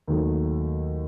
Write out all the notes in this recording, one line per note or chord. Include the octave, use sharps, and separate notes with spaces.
D#2 D#3 F#3 A3